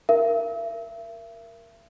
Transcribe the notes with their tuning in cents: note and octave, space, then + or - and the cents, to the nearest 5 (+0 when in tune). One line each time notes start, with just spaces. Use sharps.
A#4 +0 E5 +40